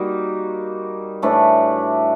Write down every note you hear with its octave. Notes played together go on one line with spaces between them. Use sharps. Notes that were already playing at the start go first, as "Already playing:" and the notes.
Already playing: G3 A#3 D#4 F#4
A2 E3 A3 D4